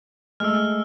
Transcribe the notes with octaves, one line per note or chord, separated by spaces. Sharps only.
G#3 A3 E6 F6